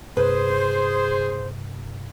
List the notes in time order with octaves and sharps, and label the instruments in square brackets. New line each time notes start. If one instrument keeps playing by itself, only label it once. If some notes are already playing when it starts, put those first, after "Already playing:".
[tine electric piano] G2 C3 [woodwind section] G#4 C5 [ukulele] B4